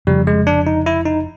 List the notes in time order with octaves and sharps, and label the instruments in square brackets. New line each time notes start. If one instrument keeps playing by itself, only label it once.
[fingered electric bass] F1 F2 C#3 [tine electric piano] G3
[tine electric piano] G#3
D4
D#4
E4
D#4